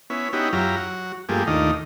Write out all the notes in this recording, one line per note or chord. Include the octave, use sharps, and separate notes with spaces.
B3 C#4 E4
B3 C#4 D#4 E4 F#4 G4
F#2 F#3 E4 F4 G4 A#5
F#3 F#4
G2 F3 A3 A#3 G4 G#4
D#2 A2 D#3 D4 F4 D#5